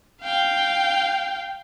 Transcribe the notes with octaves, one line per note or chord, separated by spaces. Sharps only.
F5 G5